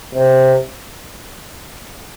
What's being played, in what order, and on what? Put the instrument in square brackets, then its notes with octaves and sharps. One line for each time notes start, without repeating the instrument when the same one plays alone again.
[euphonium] C3